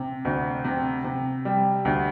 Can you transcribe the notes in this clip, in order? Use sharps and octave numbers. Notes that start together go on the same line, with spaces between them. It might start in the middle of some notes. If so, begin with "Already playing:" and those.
Already playing: C3
D2
C3
C3
G3
D2